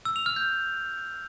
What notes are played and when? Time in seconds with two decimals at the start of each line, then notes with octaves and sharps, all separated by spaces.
0.05 E6
0.16 F7
0.26 F6
0.36 G6